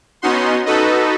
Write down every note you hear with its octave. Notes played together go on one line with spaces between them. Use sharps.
B3 C#4 D#4 F#4 C6
D#4 F#4 A4 B4 D#5